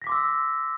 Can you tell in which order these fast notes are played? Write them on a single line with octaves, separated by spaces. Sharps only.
A#6 B6 D6 C6 E6